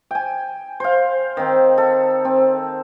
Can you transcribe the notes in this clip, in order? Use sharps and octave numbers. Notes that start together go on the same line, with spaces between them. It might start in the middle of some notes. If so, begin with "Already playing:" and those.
G5 G#5
C5 F5
D#3 C4
A4
C4